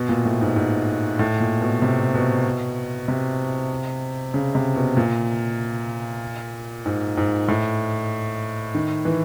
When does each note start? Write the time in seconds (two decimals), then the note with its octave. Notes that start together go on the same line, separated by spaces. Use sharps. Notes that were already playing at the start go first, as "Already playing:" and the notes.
Already playing: B2
0.09 A#2
0.25 A2
0.41 G#2
0.56 G#2
1.19 A2
1.40 A#2
1.61 B2
1.82 C3
2.14 B2
3.08 C3
4.34 C#3
4.55 C3
4.76 B2
4.97 A#2
6.86 G#2
7.17 G#2
7.48 A2
8.75 D#3
9.05 E3